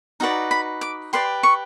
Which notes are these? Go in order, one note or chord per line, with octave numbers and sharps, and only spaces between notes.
D#4 F#4 B4 D5 A#5
B5
D6
G4 B4 D5 C6
C#6